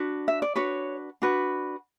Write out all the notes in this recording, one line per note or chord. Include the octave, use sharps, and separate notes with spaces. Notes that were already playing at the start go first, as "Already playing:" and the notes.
Already playing: D4 F#4 B4
E5
D5
D4 F#4 B4 C#5
D4 F#4 B4